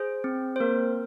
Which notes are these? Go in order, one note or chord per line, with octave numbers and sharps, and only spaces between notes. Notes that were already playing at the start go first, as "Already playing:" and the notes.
Already playing: G#4 C5
C4
C5
A#3 A#4